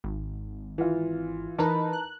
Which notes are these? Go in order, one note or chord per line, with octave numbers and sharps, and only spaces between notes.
G#1
E3 F4
E3 D#4 A#4 B4 A5 A#5
F#6